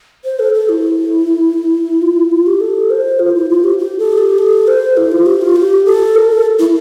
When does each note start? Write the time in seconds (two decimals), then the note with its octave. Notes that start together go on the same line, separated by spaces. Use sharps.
0.25 C5
0.39 A4
0.54 A4
0.69 E4
2.02 F4
2.16 E4
2.32 F4
2.47 G4
2.60 A4
2.90 C5
3.19 F4
3.35 E4
3.50 F4
3.64 G4
3.79 G4
3.99 A4
4.18 G4
4.38 A4
4.68 C5
4.97 E4
5.12 F4
5.26 G4
5.41 F4
5.56 G4
5.86 A4
6.15 A#4
6.30 A4
6.59 E4